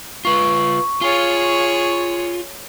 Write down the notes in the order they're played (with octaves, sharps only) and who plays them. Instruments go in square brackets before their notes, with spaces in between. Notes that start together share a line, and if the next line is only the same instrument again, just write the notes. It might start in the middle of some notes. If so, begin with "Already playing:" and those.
[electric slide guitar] F4 B4 [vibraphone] C#6
[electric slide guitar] F4 [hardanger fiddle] G#4 C#5